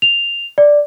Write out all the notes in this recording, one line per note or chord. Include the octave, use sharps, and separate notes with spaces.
F7
D5